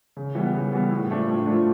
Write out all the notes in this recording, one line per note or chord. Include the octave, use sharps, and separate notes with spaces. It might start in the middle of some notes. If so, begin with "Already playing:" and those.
C#3
E3 G3 B3
C#3
E3 G3 B3
A2
F3 A3 D4 F4
A2
F3 A3 D4 F4